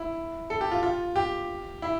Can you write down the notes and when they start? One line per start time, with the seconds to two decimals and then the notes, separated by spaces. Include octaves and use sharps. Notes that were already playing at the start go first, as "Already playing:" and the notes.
Already playing: E4
0.50 A4
0.61 G4
0.71 F4
0.83 F4
1.16 G4
1.82 E4